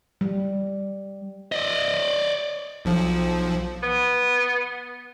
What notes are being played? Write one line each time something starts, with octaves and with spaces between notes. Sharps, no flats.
G3
D5 D#5
B1 F3
B3